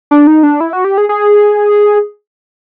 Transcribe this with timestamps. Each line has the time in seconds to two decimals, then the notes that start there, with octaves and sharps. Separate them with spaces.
0.11 D4
0.27 D#4
0.43 D4
0.60 E4
0.73 F#4
0.85 G4
0.98 G#4
1.09 G#4